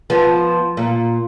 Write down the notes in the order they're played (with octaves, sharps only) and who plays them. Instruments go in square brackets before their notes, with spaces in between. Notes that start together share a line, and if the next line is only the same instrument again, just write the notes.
[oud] F3 B3
A#2